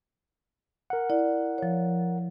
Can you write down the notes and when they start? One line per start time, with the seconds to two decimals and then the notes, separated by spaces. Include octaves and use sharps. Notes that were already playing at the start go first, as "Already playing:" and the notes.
0.90 A#4 F#5
1.10 E4 D5
1.58 F3 C#5